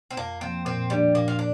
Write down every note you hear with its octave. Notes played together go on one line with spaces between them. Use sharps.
C4
F2 A#3
F3 A#3 C4
A#2 C4
F3 G3 A#3 D4
A#2 A#3
F4
D4